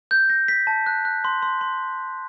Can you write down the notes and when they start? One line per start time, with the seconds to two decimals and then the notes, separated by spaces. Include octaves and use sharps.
0.11 G6
0.30 A#6
0.48 B6
0.67 A5
0.86 F#6
1.05 F#6
1.25 C6
1.42 C6
1.61 C6